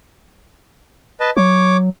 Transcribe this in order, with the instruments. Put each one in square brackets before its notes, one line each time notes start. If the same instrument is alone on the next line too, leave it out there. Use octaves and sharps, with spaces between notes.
[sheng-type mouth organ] B4 D#5 A5
[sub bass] F#3 [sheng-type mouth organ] C#5 D6